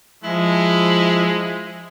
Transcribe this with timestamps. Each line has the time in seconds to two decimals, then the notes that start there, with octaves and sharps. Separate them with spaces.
0.24 F3 G#3 E4